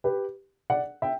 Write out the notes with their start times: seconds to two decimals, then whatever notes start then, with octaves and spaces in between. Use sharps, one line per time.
0.04 G4 B4
0.70 D5 F#5
1.02 E5 G5